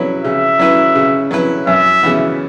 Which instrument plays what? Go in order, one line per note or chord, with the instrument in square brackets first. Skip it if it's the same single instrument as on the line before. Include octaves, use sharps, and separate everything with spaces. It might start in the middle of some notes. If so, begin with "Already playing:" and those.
Already playing: [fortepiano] C#3 F#3 C#4 E4 B4
[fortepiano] C#3 [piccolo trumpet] E5
[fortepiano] F#3 C#4 E4 B4
C#3
F#3 C#4 E4 B4
[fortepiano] F#2 [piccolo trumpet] E5
[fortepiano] C#3 E3 B3